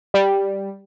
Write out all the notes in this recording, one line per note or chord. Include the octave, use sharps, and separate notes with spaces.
G3